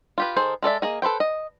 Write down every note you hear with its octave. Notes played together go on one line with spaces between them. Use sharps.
F4 G4 B4
D#3 G#4 A4 C5
G#3 A4 D5 E5
A#3 G#4 D#5
A4 B4 C5 G5
D#5